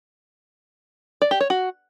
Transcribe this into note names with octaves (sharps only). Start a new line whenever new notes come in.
D5
G4
C#5
F#4